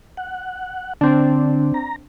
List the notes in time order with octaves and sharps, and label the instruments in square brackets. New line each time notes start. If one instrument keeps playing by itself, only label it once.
[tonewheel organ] F#5
[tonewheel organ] D3 [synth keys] C4 D4
[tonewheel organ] A#5